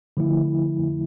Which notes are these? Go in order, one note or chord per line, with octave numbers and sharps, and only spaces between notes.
D3 F3 A3 E4